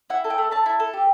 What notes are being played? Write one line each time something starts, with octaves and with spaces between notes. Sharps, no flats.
E4 F#5
A4
G5
A3
A3 A5
E4
A4
G4